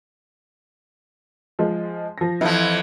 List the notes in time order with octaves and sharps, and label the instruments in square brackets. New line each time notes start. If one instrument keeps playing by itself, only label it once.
[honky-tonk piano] F3 G#3
F3 A#6
[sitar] F2 E3 F3 [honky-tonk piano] E4